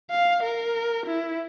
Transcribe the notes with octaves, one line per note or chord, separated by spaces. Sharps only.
F5
A#4
E4